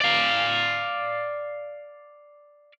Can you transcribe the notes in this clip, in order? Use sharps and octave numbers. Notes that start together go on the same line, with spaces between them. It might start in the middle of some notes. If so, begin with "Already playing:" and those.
D5 F5